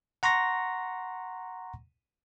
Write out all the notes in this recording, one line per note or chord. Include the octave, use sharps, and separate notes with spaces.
F#5 A#5 C6 C#6 A#6